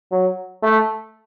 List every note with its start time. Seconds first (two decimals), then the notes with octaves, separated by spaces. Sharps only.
0.11 F#3
0.63 A3